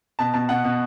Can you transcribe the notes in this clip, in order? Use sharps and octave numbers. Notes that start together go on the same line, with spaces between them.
B2 A5
B2 A5
B2 F#5
B2